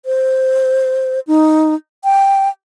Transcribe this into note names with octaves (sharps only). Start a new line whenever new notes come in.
C5
D#4
G5